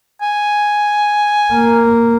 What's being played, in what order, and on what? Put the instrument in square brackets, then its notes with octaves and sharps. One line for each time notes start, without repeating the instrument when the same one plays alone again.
[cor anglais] G#5
[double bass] A#3